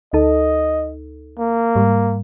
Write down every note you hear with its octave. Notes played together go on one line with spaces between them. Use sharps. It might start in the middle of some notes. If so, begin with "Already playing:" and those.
D2 D#4 A4 D#5
A#3
G#2 G3